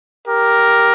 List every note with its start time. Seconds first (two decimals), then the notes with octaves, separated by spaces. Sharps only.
0.28 G4 A#4